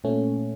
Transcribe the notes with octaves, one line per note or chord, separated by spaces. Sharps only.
A#2 A3 C#4